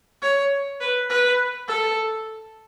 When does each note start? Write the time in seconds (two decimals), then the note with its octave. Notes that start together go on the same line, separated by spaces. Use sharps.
0.22 C#5
0.80 B4
1.10 B4
1.68 A4